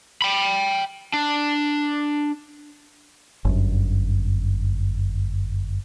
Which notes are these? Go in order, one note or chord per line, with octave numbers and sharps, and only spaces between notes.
G5 B5
D4
G1 F#2